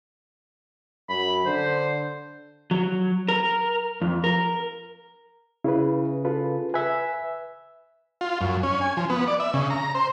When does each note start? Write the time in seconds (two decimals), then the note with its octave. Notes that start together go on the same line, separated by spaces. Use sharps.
1.09 F#2 B5
1.45 D3 C5
2.71 F#3
3.28 A#4
4.02 F2
4.24 A#4
5.64 C#3 E4 B4
6.25 F4 A4 B4
6.74 B4 E5 G#5
8.21 F4
8.41 F#2
8.63 C#4
8.81 G#5
8.97 F3
9.10 B3
9.28 D5
9.40 E5
9.54 C#3
9.70 A#5
9.95 C5